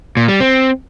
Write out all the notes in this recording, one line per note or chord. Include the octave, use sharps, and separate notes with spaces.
A#2
G3
C4